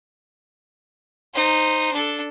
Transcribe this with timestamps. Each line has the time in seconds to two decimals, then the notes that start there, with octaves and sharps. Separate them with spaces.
1.34 D#4 C5
1.93 D4 A4